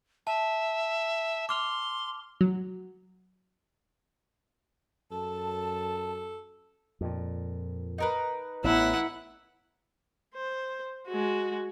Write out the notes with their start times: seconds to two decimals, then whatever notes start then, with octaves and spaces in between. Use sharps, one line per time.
0.27 E5 A5
1.49 C6 D6 F6 F7
2.41 F#3
5.11 F#2 A4 A5
7.01 F2 A#2
7.98 D#4 A#4 B4
8.64 A1 B3 E4 F#5
10.35 C5
11.08 G#3 F#4